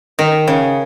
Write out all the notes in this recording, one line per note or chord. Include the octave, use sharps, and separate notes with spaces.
D#3
C#3